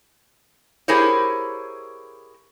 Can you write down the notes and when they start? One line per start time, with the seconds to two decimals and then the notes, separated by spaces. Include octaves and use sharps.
0.88 E4 G4 G#4 A#4 C5 C#5